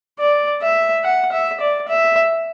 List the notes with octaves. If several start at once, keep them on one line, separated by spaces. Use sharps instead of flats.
D5
E5
F#5
E5
D5
E5